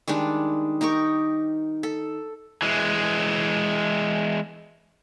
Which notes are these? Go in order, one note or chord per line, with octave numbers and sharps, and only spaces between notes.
D#3 G3 G#3 D4
D#4 G4 A#4 C#6
A4
E3 G#3